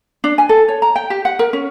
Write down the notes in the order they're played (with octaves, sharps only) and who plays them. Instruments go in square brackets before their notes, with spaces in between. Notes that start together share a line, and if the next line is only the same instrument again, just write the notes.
[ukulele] D4
G#5
A4
C#5
A#5
G5
G4
F#5
A#4
C#4